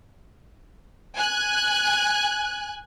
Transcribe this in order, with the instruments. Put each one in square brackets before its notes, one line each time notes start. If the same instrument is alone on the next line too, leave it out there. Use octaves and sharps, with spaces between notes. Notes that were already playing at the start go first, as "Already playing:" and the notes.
[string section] G#5 F#6